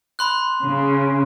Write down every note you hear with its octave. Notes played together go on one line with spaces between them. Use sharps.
B5 C6 F#6
C#3